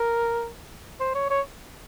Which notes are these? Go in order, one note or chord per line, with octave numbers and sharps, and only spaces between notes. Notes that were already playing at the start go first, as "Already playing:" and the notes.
Already playing: A#4
C5
C#5
C#5